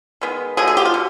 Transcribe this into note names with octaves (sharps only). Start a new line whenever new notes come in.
D#3 G#3 B3
D3 F#3 A3 G#4
G#4
G4
F4
B2